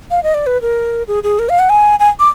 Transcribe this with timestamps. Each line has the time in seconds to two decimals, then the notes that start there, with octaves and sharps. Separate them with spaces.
0.11 F5
0.23 D#5
0.34 D5
0.46 B4
0.62 A#4
1.08 G#4
1.23 G#4
1.39 A#4
1.49 F5
1.59 F#5
1.69 G#5
1.99 G#5
2.19 D6